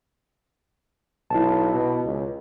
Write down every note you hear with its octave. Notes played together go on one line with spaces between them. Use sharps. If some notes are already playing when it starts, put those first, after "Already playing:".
B1 E4 A5
B2
C#2